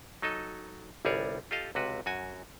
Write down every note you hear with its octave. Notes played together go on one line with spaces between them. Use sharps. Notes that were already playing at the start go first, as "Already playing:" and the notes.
F#3 D#4 A4 D#5
G1 C2 G3 G#4 C#5 D5
F4 G4 A4 D#5 F5
C#2 C3 F#4 B4
F#2 F#4 G#5